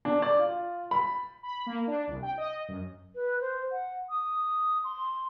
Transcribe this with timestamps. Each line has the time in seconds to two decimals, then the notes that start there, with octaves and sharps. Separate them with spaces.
0.05 D4
0.22 D5
0.39 F4
0.91 B5
1.43 B5
1.66 A#3
1.87 D4
2.07 C2
2.22 G5
2.38 D#5
2.68 F#2
3.15 B4
3.41 C5
3.72 F#5
4.10 D#6
4.84 C6